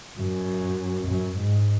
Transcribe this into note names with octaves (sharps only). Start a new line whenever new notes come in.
F#2
F#2
G#2